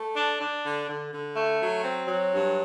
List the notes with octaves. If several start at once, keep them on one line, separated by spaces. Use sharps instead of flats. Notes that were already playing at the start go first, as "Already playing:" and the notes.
Already playing: A3
D4
D4
D3
D3
D3
A3
F#3
C4
F#3
G2